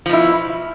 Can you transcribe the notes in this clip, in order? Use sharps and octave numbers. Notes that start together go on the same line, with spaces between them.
B2 F3 E4